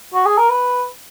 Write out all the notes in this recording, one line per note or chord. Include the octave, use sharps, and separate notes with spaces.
F#4
G#4
A#4
B4